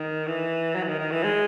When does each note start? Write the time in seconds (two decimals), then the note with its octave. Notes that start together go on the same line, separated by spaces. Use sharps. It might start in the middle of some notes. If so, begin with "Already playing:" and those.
Already playing: D#3
0.27 E3
0.75 F#3
0.83 E3
0.87 D#3
0.99 D#3
1.11 E3
1.24 G#3